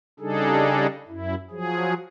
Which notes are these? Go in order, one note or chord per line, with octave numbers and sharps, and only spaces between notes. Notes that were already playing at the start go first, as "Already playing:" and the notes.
C#3 G3 D4 D#4 G#4 A4
F#2 E4
F3 F#3 G#4